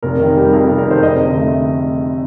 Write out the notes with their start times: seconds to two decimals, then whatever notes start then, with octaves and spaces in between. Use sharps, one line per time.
0.03 F1 A#4
0.20 D#3
0.28 A#4
0.37 G3
0.53 F2 A#4
0.65 F1 A4
0.78 A#4
0.87 D#3 C5
1.03 F1 D#5
1.21 D3
1.37 A3